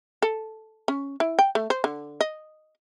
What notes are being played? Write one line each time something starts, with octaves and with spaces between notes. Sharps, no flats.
A4
C#4
E4
G5
A3
C5
D3
D#5